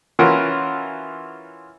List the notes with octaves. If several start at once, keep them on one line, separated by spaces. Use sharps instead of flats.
E3 C#4 F4 F#4 A#4